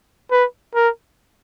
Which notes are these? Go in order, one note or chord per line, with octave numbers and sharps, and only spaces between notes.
B4
A#4